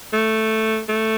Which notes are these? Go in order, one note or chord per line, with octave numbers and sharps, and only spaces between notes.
A3
A3